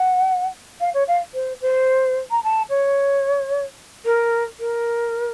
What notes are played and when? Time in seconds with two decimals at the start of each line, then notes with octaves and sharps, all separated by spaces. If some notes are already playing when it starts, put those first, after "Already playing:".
Already playing: F#5
0.80 F5
0.94 C#5
1.08 F5
1.34 C5
1.61 C5
2.31 A#5
2.44 A5
2.70 C#5
4.05 A#4
4.60 A#4